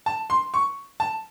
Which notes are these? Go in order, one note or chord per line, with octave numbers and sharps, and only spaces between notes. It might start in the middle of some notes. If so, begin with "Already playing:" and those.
A5
C6
C#6
A5